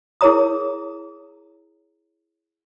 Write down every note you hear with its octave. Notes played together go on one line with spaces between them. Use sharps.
E4 G#4 A#4 C#5 A#5 D#6